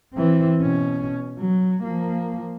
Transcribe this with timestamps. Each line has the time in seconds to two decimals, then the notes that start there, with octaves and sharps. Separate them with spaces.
0.14 E3 C4
0.61 B2 C#4
1.39 F#3
1.83 F3 A#3